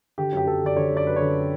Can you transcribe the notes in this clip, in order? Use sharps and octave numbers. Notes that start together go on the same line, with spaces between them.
D3 G4
F#2 G4
F#2 A4
D3 D5
D3 C#5
F#2
D5
F#2 B4
D3 C#5